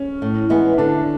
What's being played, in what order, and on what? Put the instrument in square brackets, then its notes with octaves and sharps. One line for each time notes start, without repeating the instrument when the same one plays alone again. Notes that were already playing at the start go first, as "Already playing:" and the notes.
Already playing: [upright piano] C#4
[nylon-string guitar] A2
E3 G#3 B3
[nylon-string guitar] D3 [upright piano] D4